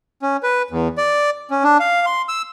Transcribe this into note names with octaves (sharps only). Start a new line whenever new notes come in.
C#4
B4
E2
D5
C#4
D4
F5
C6
E6